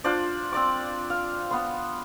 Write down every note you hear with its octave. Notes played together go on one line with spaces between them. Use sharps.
D4 F4 C5 D5
C4 D5 D6
F5
B3 C6